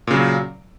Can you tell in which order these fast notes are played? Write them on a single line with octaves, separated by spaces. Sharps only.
A#2 C#3 F#3